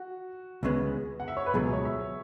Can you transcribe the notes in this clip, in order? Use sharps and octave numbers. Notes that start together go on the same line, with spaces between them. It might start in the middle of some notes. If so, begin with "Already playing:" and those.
Already playing: F#4
C#2 C#3 G#3 B3
F#5
E5
C#5
B4
C#2 B2 F#3 G#4
C#5
E5